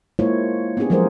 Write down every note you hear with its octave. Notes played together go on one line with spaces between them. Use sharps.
G#3 A#3 E4 F4 C5 C#5
B3 C#4 D4 G4 G#4
F3 F#3 G#3 G#4 A#4 C5